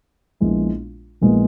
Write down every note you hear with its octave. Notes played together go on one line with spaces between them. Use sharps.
A#1 A#2 G#3 B3 E4
A#1 A#2 G#3 B3 E4